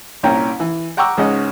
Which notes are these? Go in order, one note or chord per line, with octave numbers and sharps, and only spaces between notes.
C2 A#2 C#4 G5 A#5
E3
F#5 G5 A#5 C#6 D6 E6
C#2 G#2 C#3 C#4 D#5 F#5